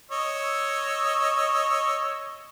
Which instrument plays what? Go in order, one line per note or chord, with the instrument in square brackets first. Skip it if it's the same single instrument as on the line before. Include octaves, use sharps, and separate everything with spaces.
[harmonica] C#5 D#5 E6